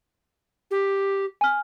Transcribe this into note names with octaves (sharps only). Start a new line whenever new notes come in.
G4
G#5 F6